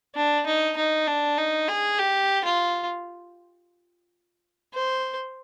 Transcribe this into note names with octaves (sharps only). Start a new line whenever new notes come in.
D4
D#4
D#4
D4
D#4
G#4
G4
F4
C5